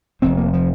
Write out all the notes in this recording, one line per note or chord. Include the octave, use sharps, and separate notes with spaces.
F1 F2 C3 C4
A#3
F3